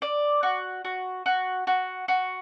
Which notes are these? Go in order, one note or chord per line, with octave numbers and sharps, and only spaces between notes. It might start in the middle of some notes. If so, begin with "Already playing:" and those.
D5
F#4
F#4
F#4
F#4
F#4